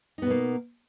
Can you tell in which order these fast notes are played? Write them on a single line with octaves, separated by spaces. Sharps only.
D#4 B3 B2 A#3